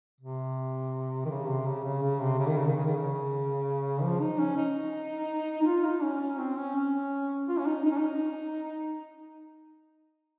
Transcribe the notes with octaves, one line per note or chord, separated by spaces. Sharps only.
C3
D#3
C#3
C3
C#3
C#3
C#3
C3
C#3
D#3
C#3
D#3
C#3
D#3
C#3
F3
D#4
C#4
D#4
D#4
F4
D#4
C#4
C#4
C4
C#4
C#4
F4
C#4
D#4
D#4
C#4
D#4